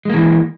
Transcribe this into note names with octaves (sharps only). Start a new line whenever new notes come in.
E3 G#3 A#3